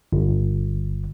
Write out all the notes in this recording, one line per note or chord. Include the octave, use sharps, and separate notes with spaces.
G1